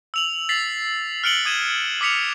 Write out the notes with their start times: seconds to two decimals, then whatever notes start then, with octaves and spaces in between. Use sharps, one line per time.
0.14 E6 F7 F#7
0.49 A6 B6 C7 F7 F#7
1.24 F6 F#6 C#7 D7 F#7 G7
1.45 D#6 G#6 D#7 E7 G7
2.01 D6 D#6 B6 C#7 F7